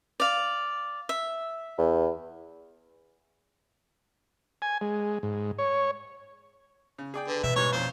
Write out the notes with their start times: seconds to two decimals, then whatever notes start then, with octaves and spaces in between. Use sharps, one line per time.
0.20 D5 F5
1.09 E5
1.78 E2
4.62 G#5
4.81 G#3
5.23 G#2
5.58 C#5
6.98 C#3
7.14 G#4 D5 G5
7.28 D3 B4
7.43 A1 B2 D#3 E5
7.56 G#2 G3 C#5
7.72 F2 A#2 C#4 C5